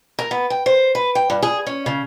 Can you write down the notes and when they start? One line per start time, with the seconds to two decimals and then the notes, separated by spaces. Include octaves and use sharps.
0.19 A#4
0.31 B3
0.50 G5
0.66 C5
0.95 B4
1.15 G5
1.30 G2
1.43 G#4
1.66 C#4
1.86 C#3